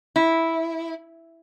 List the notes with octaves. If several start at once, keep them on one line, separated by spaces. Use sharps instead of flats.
E4